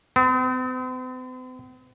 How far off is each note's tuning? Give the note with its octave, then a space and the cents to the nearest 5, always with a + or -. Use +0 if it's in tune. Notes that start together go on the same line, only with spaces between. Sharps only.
C4 -45